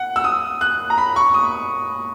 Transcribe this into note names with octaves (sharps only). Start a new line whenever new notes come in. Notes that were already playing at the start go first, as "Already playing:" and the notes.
Already playing: F#5
E6
D#6
F#6
A#5
B5
C#6
D#6